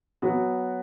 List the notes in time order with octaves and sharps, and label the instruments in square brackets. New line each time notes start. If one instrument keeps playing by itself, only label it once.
[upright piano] F#3 B3 F#4